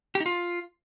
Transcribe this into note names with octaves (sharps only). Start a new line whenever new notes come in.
G4
D#4
F4